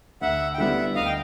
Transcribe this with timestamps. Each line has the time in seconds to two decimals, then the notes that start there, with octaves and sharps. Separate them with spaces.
0.21 D2 E5 F#5
0.54 G5
0.58 D3 G3 B3 E4 E5 F#5
0.95 D2 D#5 F5
1.05 G5